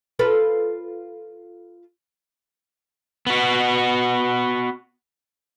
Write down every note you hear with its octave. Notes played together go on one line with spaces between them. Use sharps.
F4 A4 B4
B3 F#4